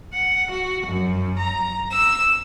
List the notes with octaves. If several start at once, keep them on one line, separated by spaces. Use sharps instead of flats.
F#5
F#4
F#2
A#5
E6